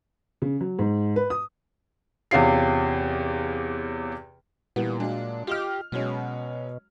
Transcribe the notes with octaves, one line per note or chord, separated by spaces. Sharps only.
C#3
F#3
G#2
B4
D#6
E2 C3 C#4 F4 C7
A#2 E3 G3 B3
F#3 G#3 D4
F4 G4 D#5 F6
B2 F#3 G#3 C#4